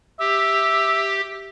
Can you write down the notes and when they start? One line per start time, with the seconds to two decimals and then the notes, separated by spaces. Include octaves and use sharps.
0.20 G4 E5